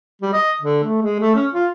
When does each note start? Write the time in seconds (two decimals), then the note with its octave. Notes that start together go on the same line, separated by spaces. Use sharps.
0.21 G3
0.33 D#5
0.62 D3
0.84 A3
1.02 G#3
1.20 A3
1.35 C#4
1.54 F4